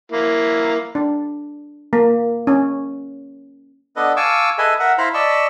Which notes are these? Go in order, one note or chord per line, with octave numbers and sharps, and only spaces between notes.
A#3 E4
D4
A#3
C#4
B3 D4 A4 B4 D#5
F5 G#5 A5 C#6 D6 E6
G#4 A4 B4 D#5 E5 G#5
A#4 E5 F#5
E4 C5 F5 A#5 B5
D5 D#5 A5 B5 C#6 E6